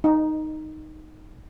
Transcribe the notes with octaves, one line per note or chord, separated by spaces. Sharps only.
D#4